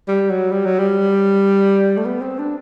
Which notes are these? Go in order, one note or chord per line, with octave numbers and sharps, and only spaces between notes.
G3
F#3
G3
F#3
G3
A3
B3
C4
D4